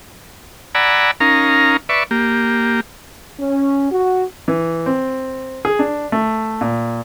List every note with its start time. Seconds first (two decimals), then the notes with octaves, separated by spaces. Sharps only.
0.75 D5 F#5 G#5 A#5 B5 E6
1.20 C#4 D#4 A#4 F5 A#5
1.89 B4 D5 E5 C#6
2.11 A#3 G4
3.39 C#4
3.91 F#4
4.48 E3
4.86 C4
5.65 G#4
5.79 D4
6.12 A3
6.61 A#2